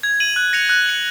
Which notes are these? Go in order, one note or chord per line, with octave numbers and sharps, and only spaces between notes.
G#6
D#7 F#7
F#6
A#6 C#7 F7
F#6
C#7 F#7